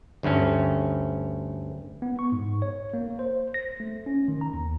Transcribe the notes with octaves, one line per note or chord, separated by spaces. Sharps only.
D2 G2 A3 C#4
B3
C#6
G#2
C#5
A#3
C5
A#6
A3
C#4
D#3
A#5
D#2